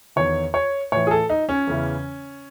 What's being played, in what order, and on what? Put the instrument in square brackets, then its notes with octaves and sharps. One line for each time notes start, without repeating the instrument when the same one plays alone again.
[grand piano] E2 D#3 C#5
C#5
A2 E3 C#5
G#4
A4
D#4
C#4
E2 C#3 E3